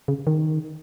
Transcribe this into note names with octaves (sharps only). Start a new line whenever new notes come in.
C#3
D#3